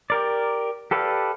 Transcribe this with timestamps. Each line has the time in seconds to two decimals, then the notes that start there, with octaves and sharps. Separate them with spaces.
0.10 G4 A#4 D5
0.91 G4 A4 B4 D5 F5